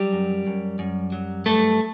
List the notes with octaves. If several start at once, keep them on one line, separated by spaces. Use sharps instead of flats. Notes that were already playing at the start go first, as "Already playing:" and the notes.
Already playing: F#3 G3 G4
F#2
F#2
F#2
F#3
G2 A3 A4